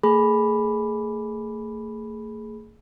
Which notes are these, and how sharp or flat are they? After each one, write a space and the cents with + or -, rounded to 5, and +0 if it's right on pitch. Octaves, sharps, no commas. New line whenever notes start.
A3 +45 G#4 +15 B5 +0